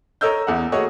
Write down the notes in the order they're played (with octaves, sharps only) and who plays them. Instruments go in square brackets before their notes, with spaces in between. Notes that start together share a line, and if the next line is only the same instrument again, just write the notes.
[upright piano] A#4 C#5 D#5 E6 G6
E2 F#5
A3 A#3 F#4 G#4 C#5 D#5